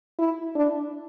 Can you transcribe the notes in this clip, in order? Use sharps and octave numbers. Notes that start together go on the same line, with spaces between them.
E4
D4